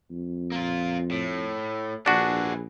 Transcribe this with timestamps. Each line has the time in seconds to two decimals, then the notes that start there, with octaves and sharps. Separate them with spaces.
0.11 F2
0.52 A#3 F4
1.11 A2
2.06 A#1 D4 F#4 G#4 B4